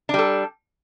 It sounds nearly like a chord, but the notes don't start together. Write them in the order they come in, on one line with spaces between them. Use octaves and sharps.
D4 G3 A4